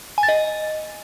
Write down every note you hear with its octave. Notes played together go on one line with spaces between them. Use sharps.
G#5
A6
D#5